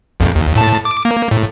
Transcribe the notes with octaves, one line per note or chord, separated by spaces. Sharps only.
A#1 F2
D#2
A2 A5
D6
A#3
A2